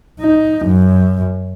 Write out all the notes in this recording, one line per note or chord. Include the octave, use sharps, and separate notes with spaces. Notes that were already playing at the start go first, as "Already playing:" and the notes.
D#4
F#2